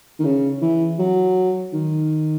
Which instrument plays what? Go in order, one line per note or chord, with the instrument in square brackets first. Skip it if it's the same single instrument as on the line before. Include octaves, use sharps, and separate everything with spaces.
[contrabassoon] D#3
C#3
E3
F#3
D#3